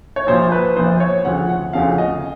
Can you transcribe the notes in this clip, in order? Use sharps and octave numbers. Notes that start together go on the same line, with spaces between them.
C#5
A#1 A#2 F3 C5
B4
A#1 A#2 F3 C5
C#5
D2 C#3 F3 F#5
F#5
D2 C#3 F3 F5
D#5